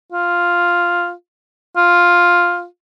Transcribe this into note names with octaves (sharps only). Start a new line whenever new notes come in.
F4
F4